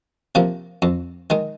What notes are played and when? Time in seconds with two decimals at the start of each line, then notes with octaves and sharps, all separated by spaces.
0.35 C3 F3 A#3
0.82 F2
1.30 D#3 G#3